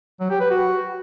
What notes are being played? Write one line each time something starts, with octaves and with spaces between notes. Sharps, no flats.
F#3
G4
B4
F#4